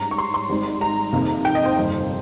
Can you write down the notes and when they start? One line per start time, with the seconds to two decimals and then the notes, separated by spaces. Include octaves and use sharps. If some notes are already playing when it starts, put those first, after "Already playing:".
Already playing: G#2 G3 C#4 A#5
0.11 C#6
0.18 C6
0.34 C6
0.49 G#1 G#2 G3 C4 D#4
0.81 A#5
1.13 F2 C3 D#3 A#3 D#4
1.45 G5
1.55 D#5
1.65 C5
1.76 G1 F2 D#3 A#3